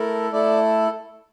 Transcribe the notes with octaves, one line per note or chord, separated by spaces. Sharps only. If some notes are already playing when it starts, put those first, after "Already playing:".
Already playing: A3 E4 A4 A#4
A3 E4 A4 D5